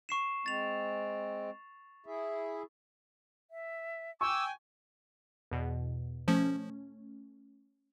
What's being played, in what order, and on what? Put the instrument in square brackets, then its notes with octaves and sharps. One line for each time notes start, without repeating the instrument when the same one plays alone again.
[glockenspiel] C#6 C7 E7
[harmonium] G#3 C4 [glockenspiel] A6 F7
[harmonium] E4 G#4 E5
[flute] E5
[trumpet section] G5 G#5 [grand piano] C#6 [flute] D6 [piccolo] E6
[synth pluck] E2 B2
[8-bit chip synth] F3 [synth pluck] A3 C#4